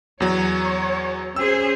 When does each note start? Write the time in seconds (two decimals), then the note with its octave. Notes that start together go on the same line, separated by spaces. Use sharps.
0.20 E2 F#3 C#5
1.36 C#4 G#4 C5 E6